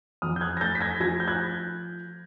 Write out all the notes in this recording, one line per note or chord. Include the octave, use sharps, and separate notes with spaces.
F2 D#6 F6
G6
F#6 G#6
A#6
A3 G6 A6
B6
G#6 A#6
F3 G#6 A#6
G6
F#6 G#6